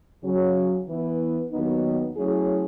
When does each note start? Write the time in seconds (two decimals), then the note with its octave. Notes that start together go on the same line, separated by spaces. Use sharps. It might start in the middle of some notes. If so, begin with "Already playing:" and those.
0.24 C#3 F#3 C#4
0.87 E3 B3 E4 B4
1.51 D#2 D#3 F#3 B3 D#4
2.16 F#3 A3 C#4 E4 G#4